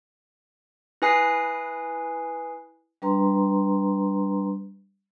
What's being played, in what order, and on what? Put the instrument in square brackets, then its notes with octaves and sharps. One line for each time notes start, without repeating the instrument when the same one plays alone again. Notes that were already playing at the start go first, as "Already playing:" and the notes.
[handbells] E4 B4 G#5 D#6 F#6 C7
[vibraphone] G3 D4 B4 A#5 C6